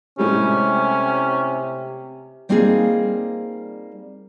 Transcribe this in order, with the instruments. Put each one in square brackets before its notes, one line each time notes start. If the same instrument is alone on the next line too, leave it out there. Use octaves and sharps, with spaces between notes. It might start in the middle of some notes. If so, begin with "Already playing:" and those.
[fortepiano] A2 G3 G#3 [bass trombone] C3 [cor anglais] C#4
[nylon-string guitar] G3 A#3 C4 D#4 F4 G#4